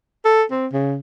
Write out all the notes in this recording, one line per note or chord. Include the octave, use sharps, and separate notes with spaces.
A4
C4
C#3